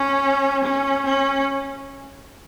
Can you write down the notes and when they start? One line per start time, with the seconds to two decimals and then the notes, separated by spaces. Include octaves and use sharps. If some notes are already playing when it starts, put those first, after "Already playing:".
Already playing: C#4
0.63 C#4
1.05 C#4